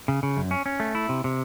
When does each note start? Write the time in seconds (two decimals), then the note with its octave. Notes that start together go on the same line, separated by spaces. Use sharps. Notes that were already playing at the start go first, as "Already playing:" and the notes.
0.08 C#3
0.23 C#3
0.37 F#2
0.51 C#4
0.66 C#4
0.80 A3
0.95 E4
1.09 C3
1.24 C3